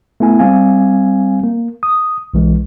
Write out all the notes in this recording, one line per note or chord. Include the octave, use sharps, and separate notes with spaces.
A3 B3 E4 G#5
G3 C4 F5 G#5
A#3
D#6
B1 E3 G#3